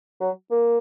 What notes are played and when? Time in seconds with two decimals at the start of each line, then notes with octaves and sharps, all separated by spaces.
0.20 F#3
0.51 A#3